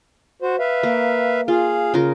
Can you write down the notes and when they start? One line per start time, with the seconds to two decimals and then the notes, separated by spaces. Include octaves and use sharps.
0.42 F#4 C5
0.59 B4 E5 F5
0.83 A#3
1.48 F4 G#4 F5
1.94 C#3 F4 A#4